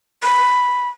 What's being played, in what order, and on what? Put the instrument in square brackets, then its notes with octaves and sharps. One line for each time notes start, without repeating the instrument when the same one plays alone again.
[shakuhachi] B5